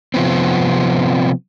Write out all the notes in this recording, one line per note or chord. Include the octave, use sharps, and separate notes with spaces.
C3 F3 B3 C4